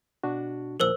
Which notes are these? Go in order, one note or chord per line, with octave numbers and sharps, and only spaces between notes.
B2 D4 F#4
D2 A#2 F3 A#4 C5 E6